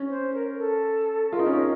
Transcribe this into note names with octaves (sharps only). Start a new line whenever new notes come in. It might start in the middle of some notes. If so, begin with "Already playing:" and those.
Already playing: C#4
C5
A#4
A4
F4 A#4
D#4
C#4
D#4